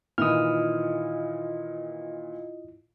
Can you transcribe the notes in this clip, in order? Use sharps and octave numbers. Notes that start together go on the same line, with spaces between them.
A#2 D#3 E3 E4 F4 D#5 D#6 F6